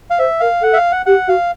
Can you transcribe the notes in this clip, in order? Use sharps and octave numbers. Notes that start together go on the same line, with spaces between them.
F5
C5 E5
A#4 F5
A4 F#5
E5
F5
F#5
G4 F#5
F#4 F5